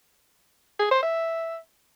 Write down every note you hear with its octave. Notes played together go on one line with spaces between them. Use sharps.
G#4
C5
E5